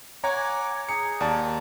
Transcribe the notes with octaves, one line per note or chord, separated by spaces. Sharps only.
C#5 F#5 G#5 A#5 D6
D#4 G#4 C#7
D#2 D5 A5